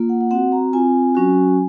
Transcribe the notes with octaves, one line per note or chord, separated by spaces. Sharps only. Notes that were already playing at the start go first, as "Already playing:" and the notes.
Already playing: A#3 F4
F#5
F#5
C4 F#4 F#5
A#5
C4 F4 G#5
F#3 C#4 F#4